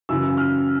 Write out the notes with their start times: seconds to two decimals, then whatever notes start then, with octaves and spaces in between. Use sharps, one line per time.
0.09 F#2 C#3 E3 E6
0.37 F6